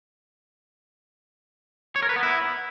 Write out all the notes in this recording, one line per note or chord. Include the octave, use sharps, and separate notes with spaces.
C#5
A#4
B4
B3
E4